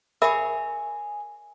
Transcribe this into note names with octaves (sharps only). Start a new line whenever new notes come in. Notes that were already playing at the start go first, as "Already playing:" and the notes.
G#4 A#4 C#5 E5 B5